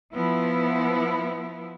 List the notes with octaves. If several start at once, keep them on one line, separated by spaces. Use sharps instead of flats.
F3 B3 E4